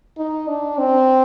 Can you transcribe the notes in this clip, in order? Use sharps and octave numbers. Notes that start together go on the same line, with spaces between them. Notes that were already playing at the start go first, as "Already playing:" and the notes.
D#4
D4
C4